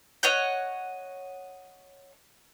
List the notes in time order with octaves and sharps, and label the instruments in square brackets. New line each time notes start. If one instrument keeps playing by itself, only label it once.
[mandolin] C#5 D#5 F#5 G6